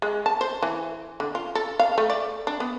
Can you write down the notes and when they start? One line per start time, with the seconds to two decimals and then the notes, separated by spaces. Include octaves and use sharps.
0.02 G#3
0.26 A5
0.41 C5
0.62 E3
1.20 D3
1.35 F4
1.55 A4
1.79 F5
1.98 A3
2.10 D5
2.47 D4
2.60 B3